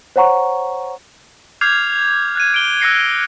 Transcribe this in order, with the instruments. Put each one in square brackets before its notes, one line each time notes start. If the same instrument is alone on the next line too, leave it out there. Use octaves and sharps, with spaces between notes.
[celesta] C5 C#5 F#5 A#5 C#6
[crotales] D6 F6 G6 G#6 C7 F7
F#6 G#6 D#7
D7 G7
E6 F#6 A#6 C7 C#7